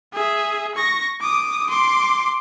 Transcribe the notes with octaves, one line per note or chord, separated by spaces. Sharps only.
G#4 E5
C#6 A#6
D6 D#6
C6 D6